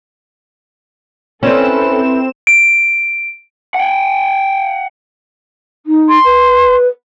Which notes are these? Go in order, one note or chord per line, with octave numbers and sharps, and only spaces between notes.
C4 C#4 E4 A4 B4 E7
D7
F#5 G5
D#4
C6
B4